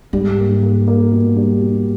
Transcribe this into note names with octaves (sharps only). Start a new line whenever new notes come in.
G#2 G3
A#3
A#3
A#3
B2
G3
B2